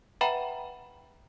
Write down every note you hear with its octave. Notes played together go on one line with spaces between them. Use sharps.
B4 E5 F#5 G5 A#5 B5